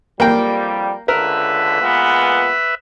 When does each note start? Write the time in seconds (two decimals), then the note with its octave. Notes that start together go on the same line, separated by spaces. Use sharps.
0.20 F2 G3 A#3 G5
1.08 C#2 D3 A#4 B4 E5
1.82 A#2 G#3 B3